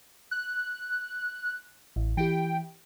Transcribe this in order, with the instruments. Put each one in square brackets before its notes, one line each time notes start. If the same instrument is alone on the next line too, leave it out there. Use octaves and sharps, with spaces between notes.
[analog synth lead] F#6
[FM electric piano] A1
[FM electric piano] E3 E4 G4 [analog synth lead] G5